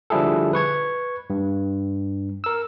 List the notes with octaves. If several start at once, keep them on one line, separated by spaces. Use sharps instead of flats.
D3 F3 G3 E4 G#4 A4
B4 C#6 G#6
G2
A#4 E6